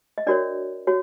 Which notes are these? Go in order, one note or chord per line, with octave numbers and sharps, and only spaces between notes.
D#5
D4 F#4 A#4 C#5 D5
F#4 C#5